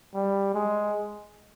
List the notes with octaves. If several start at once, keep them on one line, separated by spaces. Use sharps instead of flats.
G3
G#3